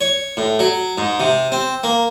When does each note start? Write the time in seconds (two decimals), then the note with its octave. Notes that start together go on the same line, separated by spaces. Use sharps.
0.01 C#5
0.37 A2
0.59 F#3
0.98 G#2
1.20 C3
1.52 C4
1.84 A#3